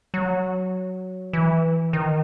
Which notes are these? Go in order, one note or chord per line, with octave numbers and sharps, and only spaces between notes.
F#3
E3
D#3